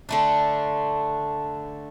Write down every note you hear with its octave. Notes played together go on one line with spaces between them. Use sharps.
D3 A3 D4